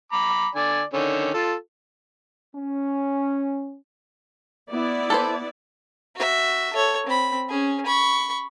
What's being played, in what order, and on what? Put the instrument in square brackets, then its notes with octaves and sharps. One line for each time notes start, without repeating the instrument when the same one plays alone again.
[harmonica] A#5 B5 D6
D3 D5 G#5
D3 D#3 C#4
F4 A4
[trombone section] C#4
[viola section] B3 E4 D5
[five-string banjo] A4 B4 C5
[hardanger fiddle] F#4 E5
A4 C#5
C4 B5
C#4 G#4
B5 C#6